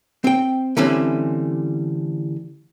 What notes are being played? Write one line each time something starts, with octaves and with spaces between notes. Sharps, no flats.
C4 G5
D3 E3 G3 A3 C4 C#4